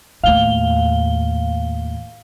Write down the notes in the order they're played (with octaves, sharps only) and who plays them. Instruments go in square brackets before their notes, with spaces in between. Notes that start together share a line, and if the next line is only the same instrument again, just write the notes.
[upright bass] D#2 A2 [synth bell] F5 G7